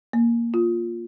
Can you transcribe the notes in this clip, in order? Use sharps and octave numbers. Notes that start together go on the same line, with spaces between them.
A#3
F4